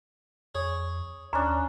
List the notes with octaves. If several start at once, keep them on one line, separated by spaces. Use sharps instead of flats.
F2 G#4 C#5
D#2 C#4 D4 A#5